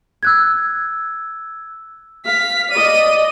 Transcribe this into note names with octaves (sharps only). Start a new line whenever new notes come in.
E6 F#6 G#6
F5 B6
D5 D#5 D#7